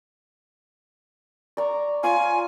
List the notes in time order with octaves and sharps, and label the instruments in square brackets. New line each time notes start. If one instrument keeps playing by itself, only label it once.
[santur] D5 A#5 C#6
[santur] F4 C#5 D5 [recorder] G#5